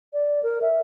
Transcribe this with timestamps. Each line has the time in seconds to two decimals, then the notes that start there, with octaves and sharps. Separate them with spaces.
0.13 D5
0.43 A#4
0.62 E5